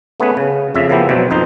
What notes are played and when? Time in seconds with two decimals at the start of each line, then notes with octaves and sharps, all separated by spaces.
0.20 A3 B3 C#4 G#4 B4
0.37 C#3
0.74 F2 C#3 E5
0.89 C#3 F3 A#3 B3 E4 G4
1.09 B2 F#3 C4 G4
1.30 A#1 F2 D#4 C5 D#5